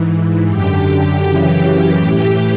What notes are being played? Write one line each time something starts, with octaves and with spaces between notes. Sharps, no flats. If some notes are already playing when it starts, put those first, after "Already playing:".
Already playing: G#2 E3
F#2 D3 G4
F#2 C#3 E3
A2 E3